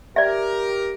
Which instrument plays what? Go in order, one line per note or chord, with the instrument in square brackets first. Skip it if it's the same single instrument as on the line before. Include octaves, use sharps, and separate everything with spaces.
[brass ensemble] G4 A#4 [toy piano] D5 E5